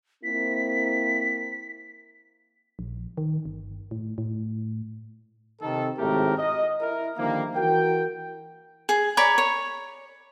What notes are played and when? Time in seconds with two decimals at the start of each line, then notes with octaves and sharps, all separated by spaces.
0.24 A#3 C4 E4 B6
2.79 A#1
3.17 D#3
3.45 G1
3.91 A2
4.18 A2
5.62 C3 D#3 A4
5.99 G#1 A2 C3 A3 G4 A#4
6.38 D#5
6.82 E4 A#4
7.18 D3 D#3 F3 G3 A#3
7.56 E3 F#4 A#4 G5
8.89 G#4
9.17 C#5 D5 A#5 B5
9.38 C#5